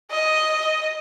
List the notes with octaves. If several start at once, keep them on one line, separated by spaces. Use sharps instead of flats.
D#5